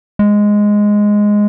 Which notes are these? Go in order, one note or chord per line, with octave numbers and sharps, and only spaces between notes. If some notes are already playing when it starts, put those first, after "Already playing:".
G#3